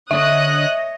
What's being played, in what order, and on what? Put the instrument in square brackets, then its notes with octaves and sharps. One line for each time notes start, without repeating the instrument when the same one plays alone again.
[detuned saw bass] D3 [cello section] C#5 D#5 [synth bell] E5 [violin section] D#6 F#6